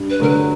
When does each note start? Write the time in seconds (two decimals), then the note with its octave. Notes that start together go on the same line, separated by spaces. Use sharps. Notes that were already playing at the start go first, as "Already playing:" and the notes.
Already playing: G2
0.10 B4
0.20 D3 F#3 A3 A#4
0.29 B4